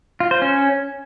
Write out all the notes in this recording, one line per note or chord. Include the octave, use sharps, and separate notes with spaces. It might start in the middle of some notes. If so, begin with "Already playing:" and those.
F4
C5
C#4